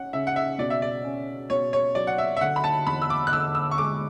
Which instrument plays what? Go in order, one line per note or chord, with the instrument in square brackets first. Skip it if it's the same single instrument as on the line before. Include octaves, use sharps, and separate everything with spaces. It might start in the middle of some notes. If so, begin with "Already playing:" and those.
Already playing: [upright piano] C#4 [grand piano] F#5
[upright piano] C#3 [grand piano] E5
[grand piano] F#5
E5
[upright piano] B2 [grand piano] D5
[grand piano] E5
D5
[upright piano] C#4
[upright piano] B2 [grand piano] C#5
[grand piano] C#5
[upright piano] F#3 [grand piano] D5
[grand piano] F#5
E5
E5
[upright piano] D3 [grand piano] F#5
[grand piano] B5
A5
[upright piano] E2 [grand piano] B5
[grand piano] E6
D6
F#6
[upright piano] D3 [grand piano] E6
[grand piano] E6
C#6
[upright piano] G#3 [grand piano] D6